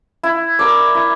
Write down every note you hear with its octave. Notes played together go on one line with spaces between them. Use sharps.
E4
A#4 D5
E4